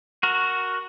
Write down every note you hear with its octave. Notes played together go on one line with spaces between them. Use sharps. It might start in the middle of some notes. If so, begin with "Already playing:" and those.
F#4 A#4